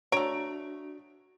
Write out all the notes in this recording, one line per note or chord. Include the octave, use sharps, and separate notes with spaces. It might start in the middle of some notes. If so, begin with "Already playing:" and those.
A3 D4 F#4 C#5 A#5 D7